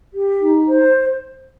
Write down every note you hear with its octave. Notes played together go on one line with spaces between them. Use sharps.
G4
D#4
C5